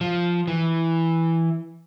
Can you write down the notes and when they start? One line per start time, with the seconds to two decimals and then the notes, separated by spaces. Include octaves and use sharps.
0.01 F3
0.48 E3